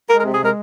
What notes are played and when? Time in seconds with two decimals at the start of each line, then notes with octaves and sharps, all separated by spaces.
0.09 G#3 A#4
0.20 A#4
0.25 C3
0.32 G#4
0.40 G#3 A#4